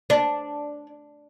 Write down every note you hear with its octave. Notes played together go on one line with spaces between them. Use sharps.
D4